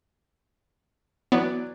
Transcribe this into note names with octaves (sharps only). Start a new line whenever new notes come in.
E3 F#3 B3 D5